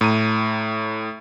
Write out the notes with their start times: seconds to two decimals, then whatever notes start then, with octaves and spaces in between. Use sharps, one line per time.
0.01 A2 A#5 D#7